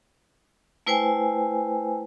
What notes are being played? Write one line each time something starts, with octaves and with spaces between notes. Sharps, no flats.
A3 E4 B4 C5 G5 G#5